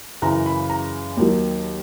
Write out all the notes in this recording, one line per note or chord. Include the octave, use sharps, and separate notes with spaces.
F#2 C#3 E3 A#5
B5
A#5
D#2 D#3 F#3